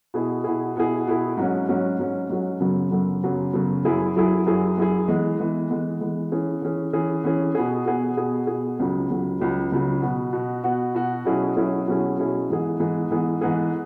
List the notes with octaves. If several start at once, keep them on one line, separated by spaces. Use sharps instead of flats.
B2 B3 E4 G#4
B2 B3 E4 G#4
B2 B3 E4 G#4
B2 B3 E4 G#4
G#2 F#3 C#4
G#2 F#3 C#4
G#2 F#3 C#4
G#2 F#3 C#4
F#2 C#3 F#3 B3
F#2 C#3 F#3 B3
F#2 C#3 F#3 B3
F#2 C#3 F#3 B3
F#2 F#3 E4 G#4
F#2 F#3 E4 G#4
F#2 F#3 E4 G#4
F#2 F#3 E4 G#4
E3 G#3 B3
E3 G#3 B3
E3 G#3 B3
E3 G#3 B3
E3 C#4 G#4
E3 C#4 G#4
E3 C#4 G#4
E3 C#4 G#4
B2 B3 G#4
B2 B3 G#4
B2 B3 G#4
B2 B3 G#4
C#2 C#3 F#3
C#2 C#3 F#3
C#2 C#3 F#3
C#2 C#3 F#3
B2 B3 F#4
B2 B3 F#4
B2 B3 F#4
B2 B3 F#4
B2 F#3 C#4 E4 G#4
B2 F#3 C#4 E4 G#4
B2 F#3 C#4 E4 G#4
B2 F#3 C#4 E4 G#4
G#2 E3 B3 G#4
G#2 E3 B3 G#4
G#2 E3 B3 G#4
G#2 E3 B3 G#4